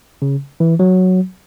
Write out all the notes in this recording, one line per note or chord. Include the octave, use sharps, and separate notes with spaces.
C#3
E3
F#3